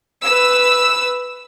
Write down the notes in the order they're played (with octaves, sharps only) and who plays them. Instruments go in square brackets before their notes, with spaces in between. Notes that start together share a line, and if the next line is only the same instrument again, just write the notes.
[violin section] B4 E6